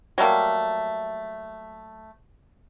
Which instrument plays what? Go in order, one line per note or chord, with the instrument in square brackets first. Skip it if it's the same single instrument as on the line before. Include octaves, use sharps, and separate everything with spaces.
[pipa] F#3 G3 A3 A#3